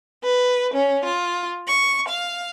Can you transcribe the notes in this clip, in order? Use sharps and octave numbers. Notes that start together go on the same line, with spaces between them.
B4
C#4
F4
C#6
F5